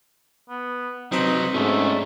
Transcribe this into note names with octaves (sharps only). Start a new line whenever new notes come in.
B3
C2 F#3 C4 D#4 B4 A5
G#2 A3 C#4 D4